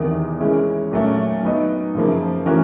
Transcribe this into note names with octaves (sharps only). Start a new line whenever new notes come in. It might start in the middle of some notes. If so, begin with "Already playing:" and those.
Already playing: E2 C3 D#3
G#3 C#4 E4
A#2 F#3 A3 C#4
F#3 B3 D#4
F#2 C#3 F3 A#3
E3 A3 C#4 F#4 A#4